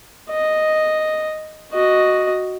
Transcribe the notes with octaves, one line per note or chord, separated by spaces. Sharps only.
D#5
F#4 D#5